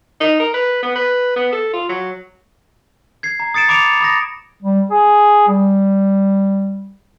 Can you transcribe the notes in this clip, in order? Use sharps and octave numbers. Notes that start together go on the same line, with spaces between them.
D#4
A#4
B4
B3
B4
B3
A4
F4
F#3
G#6 C7
A#5
D#6 A6 C#7 D7 E7
B5 D6 C#7 D7 F7
B5 D#6 A#6
G3
G#4
G3